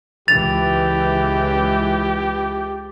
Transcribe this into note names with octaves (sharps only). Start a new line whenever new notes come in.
C#2 E3 G4 A6 F7